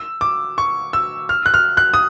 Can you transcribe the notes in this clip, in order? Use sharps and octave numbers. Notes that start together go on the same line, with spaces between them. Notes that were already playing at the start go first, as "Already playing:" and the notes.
Already playing: E6
D6
C#6
E6
F6
F#6
F6
F#6
D#6